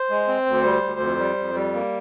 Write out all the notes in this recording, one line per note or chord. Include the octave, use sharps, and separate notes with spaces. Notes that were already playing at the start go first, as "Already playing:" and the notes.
Already playing: C5
G#3
C4
D2
G3
D2
F2
G3
F2
G3
A#3